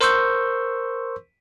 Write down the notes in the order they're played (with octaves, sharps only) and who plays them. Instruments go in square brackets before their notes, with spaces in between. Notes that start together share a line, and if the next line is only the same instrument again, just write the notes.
[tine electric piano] A#4 C5 C6 C#6 E6 G6